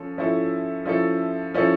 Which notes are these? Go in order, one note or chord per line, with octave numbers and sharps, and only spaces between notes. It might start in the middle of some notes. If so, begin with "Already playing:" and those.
Already playing: F3 C#4 A4
F3 C#4 E4 A4
F3 C#4 E4 A4
F3 C#4 E4 A4